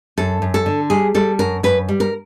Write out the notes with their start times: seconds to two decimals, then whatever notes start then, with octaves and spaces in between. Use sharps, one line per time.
0.17 F#2 A4
0.42 F#2
0.54 A4
0.66 D3
0.90 G3 G#4
1.14 G3 A4
1.39 F#2 A#4
1.63 F#2 B4
1.89 G3
2.00 A#4